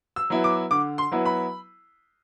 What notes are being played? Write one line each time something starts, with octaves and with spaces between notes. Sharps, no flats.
E6
F#3 B3 E4
D6
D3 D6
C6
F#3 B3 E4
B5